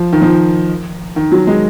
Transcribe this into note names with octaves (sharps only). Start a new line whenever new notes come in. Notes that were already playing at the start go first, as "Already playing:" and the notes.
Already playing: F3
D#3
F3
D#3
F#3
G#3